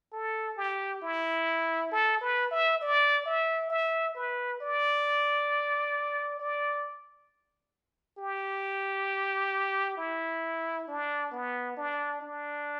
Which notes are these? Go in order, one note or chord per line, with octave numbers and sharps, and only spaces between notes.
A4
G4
E4
A4
B4
E5
D5
E5
E5
B4
D5
D5
G4
E4
D4
B3
D4
D4